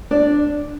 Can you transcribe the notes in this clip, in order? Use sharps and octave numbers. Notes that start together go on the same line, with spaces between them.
D4 D5